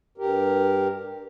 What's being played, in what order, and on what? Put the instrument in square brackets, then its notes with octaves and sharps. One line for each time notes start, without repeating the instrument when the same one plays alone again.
[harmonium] G2 G4 A#4